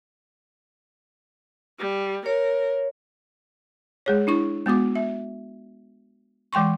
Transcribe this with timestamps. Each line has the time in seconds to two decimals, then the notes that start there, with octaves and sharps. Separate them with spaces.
1.79 G3
2.26 A#4 C#5
4.06 G#3 G#4 C#5
4.27 D4 E4 C#6
4.66 G#3 B3 F#4 D6
4.95 E5
6.53 E3 G#3 G5 C6 C#6